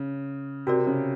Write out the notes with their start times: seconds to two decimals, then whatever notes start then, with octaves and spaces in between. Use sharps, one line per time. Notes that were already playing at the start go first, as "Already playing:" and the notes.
Already playing: C#3
0.67 C3 F#4 A#4 D5
0.87 C#3